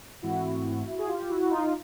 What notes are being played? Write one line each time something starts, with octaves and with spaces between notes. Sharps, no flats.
G#2 E3 A3 C4 E4 F#4
G#4
F4 G4
E4 F#4
D#4 F4